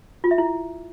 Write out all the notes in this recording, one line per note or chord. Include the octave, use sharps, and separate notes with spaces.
F4
E5
E4